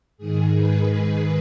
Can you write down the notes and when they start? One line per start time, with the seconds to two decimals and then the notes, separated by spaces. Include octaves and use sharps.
0.17 G#2 D#3 G#4
0.54 B4
0.89 G#4